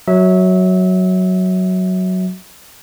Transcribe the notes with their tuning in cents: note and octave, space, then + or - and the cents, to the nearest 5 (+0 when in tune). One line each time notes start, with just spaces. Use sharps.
F#3 +0 E5 -25